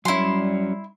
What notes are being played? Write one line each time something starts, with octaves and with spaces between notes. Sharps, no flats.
F#3 G3 C#4 E4 C6